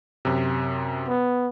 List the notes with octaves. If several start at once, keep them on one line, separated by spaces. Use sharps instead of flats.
F#2 C3
B3